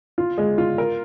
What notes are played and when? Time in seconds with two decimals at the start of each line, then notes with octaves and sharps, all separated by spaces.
0.18 F4
0.38 G#3
0.58 F4
0.78 A#4